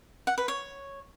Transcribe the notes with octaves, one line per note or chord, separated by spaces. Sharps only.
F#5
B4
C#5